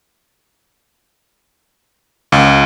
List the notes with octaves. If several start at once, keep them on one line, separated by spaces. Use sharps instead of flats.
C#2